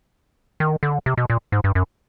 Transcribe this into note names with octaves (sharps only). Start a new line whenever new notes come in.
D#3
D3
C3
B2
A#2
G#2
G2
F#2